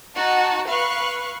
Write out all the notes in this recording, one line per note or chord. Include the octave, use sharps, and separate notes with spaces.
D#4 F#4 A5
B4 F5 C#6 F#6